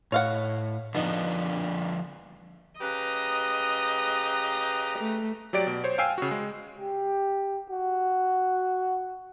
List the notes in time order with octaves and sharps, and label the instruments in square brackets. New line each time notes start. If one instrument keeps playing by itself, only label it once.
[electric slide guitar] A2 [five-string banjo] C#5 F5 F#5
[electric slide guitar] D3 F3 D4 [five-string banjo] B3 D#4
[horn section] C#3 G4 A#5 [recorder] B4 [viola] D#5
[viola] A3
[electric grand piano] F#3 G4 D5 D7
B2
C5 C#5
F5 G5 G#5 E6 C7
C#3 F#4
G#3
[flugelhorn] G4
F#4